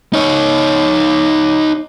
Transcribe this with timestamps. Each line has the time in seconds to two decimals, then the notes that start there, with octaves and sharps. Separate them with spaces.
0.13 D#4 C#5